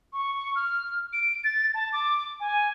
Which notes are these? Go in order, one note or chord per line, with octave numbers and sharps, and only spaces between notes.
C#6
F6
D7
A6
A5
D6
G#5